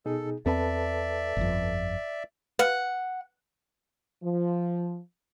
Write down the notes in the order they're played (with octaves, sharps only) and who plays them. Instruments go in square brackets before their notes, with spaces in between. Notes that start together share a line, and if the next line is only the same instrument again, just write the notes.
[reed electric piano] B2 D#4 G#4 [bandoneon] A4
[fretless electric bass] E2 C4 [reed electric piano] A4 B4 A5 [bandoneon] D5 E5
[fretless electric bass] G1 F2
[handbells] B4 F5 F6 [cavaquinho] F#5
[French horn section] F3